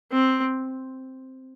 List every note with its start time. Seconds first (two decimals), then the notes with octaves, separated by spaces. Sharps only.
0.12 C4